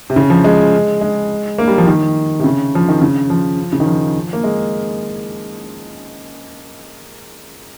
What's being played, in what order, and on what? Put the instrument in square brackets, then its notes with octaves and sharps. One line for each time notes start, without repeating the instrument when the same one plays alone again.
[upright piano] C3
C#3
F3
G#3
G#3
A#3
G3
F3
D#3
C3
C#3
F3
D#3
C#3
F3
C#3
D#3
F3
A#3
G#3